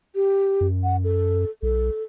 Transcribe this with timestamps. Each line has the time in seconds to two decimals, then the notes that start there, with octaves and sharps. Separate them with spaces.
0.15 G4
0.61 F#2
0.83 F#5
1.04 A4
1.62 B1 A4